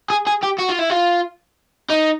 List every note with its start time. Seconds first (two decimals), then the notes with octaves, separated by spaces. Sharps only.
0.10 G#4
0.27 G#4
0.43 G4
0.59 F#4
0.69 F4
0.79 E4
0.90 F4
1.90 D#4